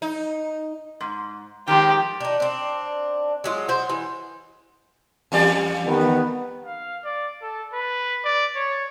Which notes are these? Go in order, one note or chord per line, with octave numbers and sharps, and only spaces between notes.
D#4
G#2
D#3 F3 G#3 G4
D4 D#4
C4 D4
F#3 G#3 F4
F#4 C5
E3
E2 G3 D5
D#3 B3
F5
D5
A4
B4
D5
C#5